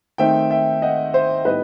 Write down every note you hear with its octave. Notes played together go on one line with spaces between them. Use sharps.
D#3 A3 C4 D#4 E5 G5
E5 G5
D#5 F#5
C5 E5
A2 G3 B3 D#4 B4 D#5